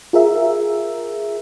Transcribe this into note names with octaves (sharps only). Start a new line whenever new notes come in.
F4 G#4 A#4 E5